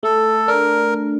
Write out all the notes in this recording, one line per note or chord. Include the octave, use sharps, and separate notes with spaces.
A3 A4
D4 A#4